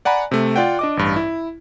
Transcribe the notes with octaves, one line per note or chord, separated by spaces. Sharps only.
D5 F#5 G#5 A#5 B5
C3 A3
F4 D5 F#5 G5
D4 D#5 D6
A1 G2
E4